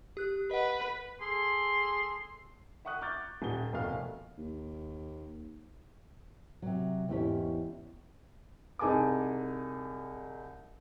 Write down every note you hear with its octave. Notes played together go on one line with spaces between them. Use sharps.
G4 F#6
B4 D#5 F#5
G#4 A4 C6
E5 F#5 C#6 D#6 F#6
C#6 D6 F6 G6 A6
D#1 G7
F1 D#2 B2 A3 F5 F6
D#2
C3 F#3
E2 G#2 C#4 E4 G4 C#5
C2 D#4 G#4 G#5 A5 D6